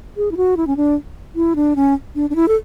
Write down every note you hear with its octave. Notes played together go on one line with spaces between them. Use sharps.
G#4
E4
F#4
E4
C#4
D4
E4
D4
C#4
D4
D4
E4
A4